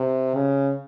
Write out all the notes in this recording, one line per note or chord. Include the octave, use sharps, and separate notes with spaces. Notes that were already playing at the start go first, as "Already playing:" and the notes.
Already playing: C3
C#3